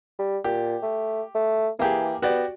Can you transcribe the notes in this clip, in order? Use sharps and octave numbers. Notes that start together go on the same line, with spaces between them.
G3
A#2 G4
A3
A3
E3 A#3 G4 G#4
B3 F#4 G4 D5